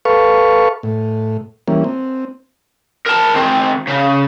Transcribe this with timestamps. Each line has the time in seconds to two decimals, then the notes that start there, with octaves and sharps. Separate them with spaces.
0.05 A4 B4 F5 C#6
0.83 A2
1.68 E3 G3 A#3 C#4
1.84 C4
3.06 A#4 A5
3.34 D#3 C4
3.87 C#3